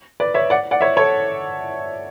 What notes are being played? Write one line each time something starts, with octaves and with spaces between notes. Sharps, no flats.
B4 D5
C#5 E5
D5 F#5
D5 F#5
C#5 E5
A4 C#5